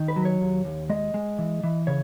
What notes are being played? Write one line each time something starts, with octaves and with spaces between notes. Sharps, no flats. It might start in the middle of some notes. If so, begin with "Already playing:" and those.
Already playing: D#3
B4
F#3
C#5
D#2
D#2
G#3 D#5
G#3
E3
E3
C#3 C#5